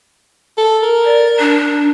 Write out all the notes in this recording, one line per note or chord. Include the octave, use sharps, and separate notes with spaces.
A4
A#4
D5
D4